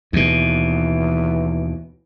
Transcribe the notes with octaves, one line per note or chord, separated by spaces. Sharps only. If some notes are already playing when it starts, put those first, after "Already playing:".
D#2 B2 E3